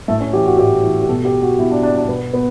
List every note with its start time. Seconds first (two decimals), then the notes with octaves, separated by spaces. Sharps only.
0.08 A2 A3
0.20 C#4
0.33 E3 G4
0.46 F#4
0.58 A2 G4
0.83 E3
1.02 G4
1.08 B2 A4
1.25 G4
1.42 F#4
1.58 B2 E4
1.71 D4
1.83 D4
1.96 D4
2.08 B2 B3
2.33 B3